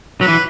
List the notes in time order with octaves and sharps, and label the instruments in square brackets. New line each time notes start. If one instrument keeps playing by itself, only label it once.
[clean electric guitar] F#3 [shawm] B4
[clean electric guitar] E3